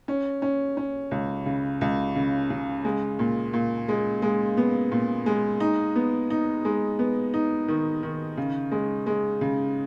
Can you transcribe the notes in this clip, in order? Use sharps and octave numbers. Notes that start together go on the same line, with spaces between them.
C#4
C#4
C#4
C#2
C#3
C#2
C#3
C#3
G#3
A#2
A#2
G#3
G#3
B3
A#2
G#3
D#4
B3
D#4
G#3
B3
D#4
D#3
D#3
C#3
G#3
G#3
C#3